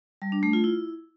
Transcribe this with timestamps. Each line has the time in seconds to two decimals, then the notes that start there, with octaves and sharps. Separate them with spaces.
0.22 G3
0.32 D4
0.43 A3
0.53 F4
0.64 E4